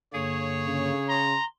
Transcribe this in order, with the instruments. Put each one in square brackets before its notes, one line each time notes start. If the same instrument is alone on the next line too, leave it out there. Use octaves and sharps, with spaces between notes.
[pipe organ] G2 D3 A#3 [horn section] G#4 C#5
[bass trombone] C#3
[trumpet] A#5 [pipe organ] C6